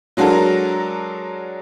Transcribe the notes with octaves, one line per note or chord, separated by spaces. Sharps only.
F#3 G#3 D4 F#4 A4 A#4